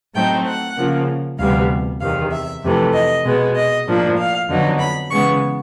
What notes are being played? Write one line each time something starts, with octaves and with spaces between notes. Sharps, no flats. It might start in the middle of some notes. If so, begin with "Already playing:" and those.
A2 F#3 A3 C4 D#4 G5
F#5
C#3 F3 A#3
D2 C3 E3 G3 B3 F5
E2 C3 D#3 F5
E5
F2 C3 E3 A3
D#5
B2 G#3 B3
D#5
A2 F3 A#3 D4
F5
F2 D3 F#3 B3 D#4
B5
C#3 E3 G#3 B3 C#6